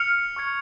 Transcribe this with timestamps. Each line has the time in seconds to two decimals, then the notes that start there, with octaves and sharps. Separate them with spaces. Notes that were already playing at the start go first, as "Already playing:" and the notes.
Already playing: F6 C#7 F7
0.36 C#6 F6 G#6 C#7